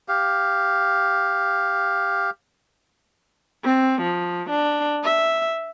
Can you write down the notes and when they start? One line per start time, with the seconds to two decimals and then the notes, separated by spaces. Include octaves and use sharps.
0.08 G4 F5
3.65 C4
4.02 F3
4.50 D4
5.04 E5